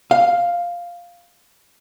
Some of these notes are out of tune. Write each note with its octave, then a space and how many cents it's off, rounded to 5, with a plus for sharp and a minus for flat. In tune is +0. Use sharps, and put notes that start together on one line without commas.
F5 +0